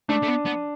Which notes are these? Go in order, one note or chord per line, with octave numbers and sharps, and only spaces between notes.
A3 D4
A3
B3
B3